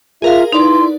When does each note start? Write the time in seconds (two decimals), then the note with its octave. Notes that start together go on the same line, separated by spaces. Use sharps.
0.22 F4 G#4 A#4 E5 F5
0.52 D#4 E4 B4 D5 C6